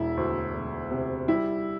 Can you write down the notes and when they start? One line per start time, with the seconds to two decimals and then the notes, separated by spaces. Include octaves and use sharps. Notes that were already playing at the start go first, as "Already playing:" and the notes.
Already playing: E1 E4
0.17 D2
0.54 E1
0.91 C3
1.28 G3 E4